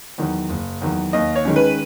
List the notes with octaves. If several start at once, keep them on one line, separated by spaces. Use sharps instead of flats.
E2 D#3 F#3
F#1
E2 D#3 F#3
D#2 D#5
C#5
D#3 G#3 C#4
B4